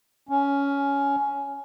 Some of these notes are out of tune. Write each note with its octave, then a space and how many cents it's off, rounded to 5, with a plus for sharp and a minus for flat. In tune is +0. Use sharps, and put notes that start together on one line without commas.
C#4 +15